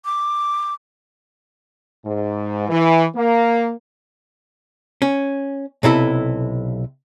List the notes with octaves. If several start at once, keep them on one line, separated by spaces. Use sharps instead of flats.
D6
G#2
E3
A#3
C#4
B1 C3 E4 A4